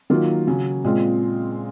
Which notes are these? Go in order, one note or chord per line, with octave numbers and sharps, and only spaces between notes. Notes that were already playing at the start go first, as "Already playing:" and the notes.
D#3 F#3 A#3 F4 A#4
C#3 F#3 C#4
A#2 G#3 C4 F4